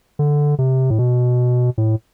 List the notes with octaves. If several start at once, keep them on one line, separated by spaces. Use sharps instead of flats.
D3
C3
A2
B2
A2